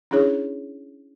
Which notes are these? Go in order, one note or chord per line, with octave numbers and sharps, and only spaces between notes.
C#4 D4 E4 G#4 C#5